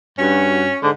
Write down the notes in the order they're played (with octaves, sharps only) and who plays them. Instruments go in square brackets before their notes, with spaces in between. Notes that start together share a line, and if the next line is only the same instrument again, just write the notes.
[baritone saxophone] G2 [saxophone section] C#4 F#4
[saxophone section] G#2 G#3 [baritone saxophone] D3